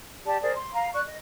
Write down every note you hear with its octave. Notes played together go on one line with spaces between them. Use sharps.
G4 D5 A5
G#4 A#4 C5 D5
C6
F5 A#5
D5 C#6 F#6
D#5